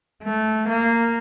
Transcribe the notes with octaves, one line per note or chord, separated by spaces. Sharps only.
A3
A#3